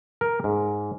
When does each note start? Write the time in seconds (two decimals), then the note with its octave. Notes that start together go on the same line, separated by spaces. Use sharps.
0.21 A#4
0.44 G#2